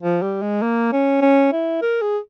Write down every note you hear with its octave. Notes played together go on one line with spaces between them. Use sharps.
F3
G3
G#3
A#3
C#4
C#4
E4
A#4
G#4